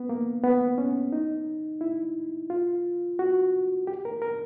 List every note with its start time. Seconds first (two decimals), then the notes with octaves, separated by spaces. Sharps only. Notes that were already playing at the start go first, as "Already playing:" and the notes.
Already playing: B3
0.09 A#3
0.43 B3
0.78 C#4
1.13 D#4
1.81 E4
2.50 F4
3.19 F#4
3.87 G4
4.05 A#4
4.22 A#4